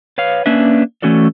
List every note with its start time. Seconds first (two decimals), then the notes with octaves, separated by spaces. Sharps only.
0.18 B4 C#5 F5
0.46 A#3 C#4 D4 B4 E5
1.02 E3 A3 C#4 F#4 A4 D5